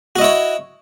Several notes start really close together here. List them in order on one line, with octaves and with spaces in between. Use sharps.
F#4 D#5 E4 C#5